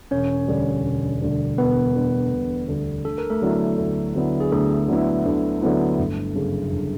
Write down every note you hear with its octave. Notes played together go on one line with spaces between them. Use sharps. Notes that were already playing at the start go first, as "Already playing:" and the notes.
E1 C#4 C#5
D2 D3 G3
E1
D2 D3 G3
E1 B3 B4
D2 D3 G3
E1
D2 D3 G3
D2 A4
A#4
A3 A4
D3 F#3 B3 E4
D2
D3 F#3 B3 E4
G#4
D2 A3 A4
D3 F#3 B3 E4
D2
D3 F#3 B3 E4
G1
F#2 C#3
G1